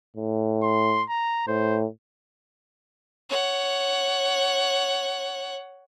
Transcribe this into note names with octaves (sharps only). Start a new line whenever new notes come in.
A2
C6
A#5
A2 C5
C#5 F#5